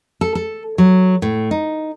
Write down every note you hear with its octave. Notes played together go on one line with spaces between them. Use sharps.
A4
A4
F#3
A2
D#4